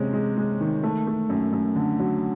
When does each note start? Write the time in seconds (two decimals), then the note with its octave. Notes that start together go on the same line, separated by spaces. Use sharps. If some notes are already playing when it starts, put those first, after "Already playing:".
Already playing: C3 G#3 C#4
0.14 G#3
0.37 G#3
0.61 D#3
0.83 A3
1.07 A3
1.30 F#2
1.53 F#2
1.76 D3
2.00 F#3